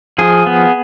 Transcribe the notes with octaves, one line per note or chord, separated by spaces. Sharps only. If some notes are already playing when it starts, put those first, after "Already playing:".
F3 G#4
B3